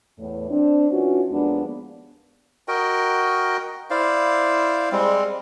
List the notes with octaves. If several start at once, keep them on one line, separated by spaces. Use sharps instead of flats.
E2 A2
C4 D4
E3 C#4 D4 F4 F#4
D#2 F3 G#3 A#3 B3 D4
F#4 A#4 D#5 G5
E4 C5 D5 F5
G3 G#3 C4